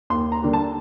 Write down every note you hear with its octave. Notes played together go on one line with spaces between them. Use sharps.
D#2 C6
A#5
D3 G3 A#3
A5